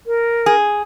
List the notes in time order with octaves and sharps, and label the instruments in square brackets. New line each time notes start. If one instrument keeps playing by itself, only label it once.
[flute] A#4
[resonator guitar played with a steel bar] G#4